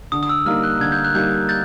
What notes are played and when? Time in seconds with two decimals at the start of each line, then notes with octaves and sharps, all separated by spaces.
0.12 D3 D#6
0.23 D#6
0.29 E6
0.45 G3 A#3 D#4 F6
0.63 F#6
0.80 D3 G#6
0.92 G6
1.04 F#6
1.14 G3 A#3 D#4 G6
1.49 G6 A6